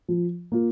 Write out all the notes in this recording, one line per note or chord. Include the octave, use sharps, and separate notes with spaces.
F3
A#3 F4